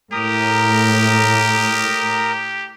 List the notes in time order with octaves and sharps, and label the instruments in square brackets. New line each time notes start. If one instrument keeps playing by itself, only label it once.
[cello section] A2 [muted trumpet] G4 [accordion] A#4 A#5 D#6